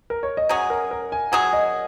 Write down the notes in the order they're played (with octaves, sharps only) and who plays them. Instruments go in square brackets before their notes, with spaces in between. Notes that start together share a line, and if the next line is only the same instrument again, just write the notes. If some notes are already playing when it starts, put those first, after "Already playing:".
[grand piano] A#4
C#5
D#5
[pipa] F#3 C#4 G#4 [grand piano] F#5
[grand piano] A#4
A#4
G#5
[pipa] F#3 C#4 G#4 [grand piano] F#5
[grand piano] D#5